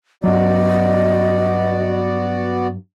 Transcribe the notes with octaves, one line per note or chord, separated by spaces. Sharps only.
G2 F#3 B3 F#4 D5 D#5